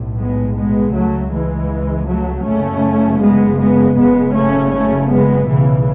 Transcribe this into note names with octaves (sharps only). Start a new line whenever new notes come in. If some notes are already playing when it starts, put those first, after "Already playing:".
Already playing: B1 A2
G#3 B3
G#3 B3
C#2 C#3 F#3 A3
E3 G#3
F#3 A3
F#1 F#2 C#3 A3 C#4
G#3 B3
G#3 B3
F#1 F#2 C#3 G#3 B3
A3 C#4
A3 C#4
G#3 B3
B1 A2 C#3 E3